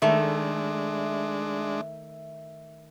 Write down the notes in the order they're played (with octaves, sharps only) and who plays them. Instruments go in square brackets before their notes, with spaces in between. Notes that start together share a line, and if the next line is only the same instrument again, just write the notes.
[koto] D#3 A3 [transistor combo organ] G#3 D4 [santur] E5